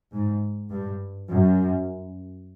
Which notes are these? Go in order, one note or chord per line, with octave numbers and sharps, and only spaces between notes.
G#2
G2
F#2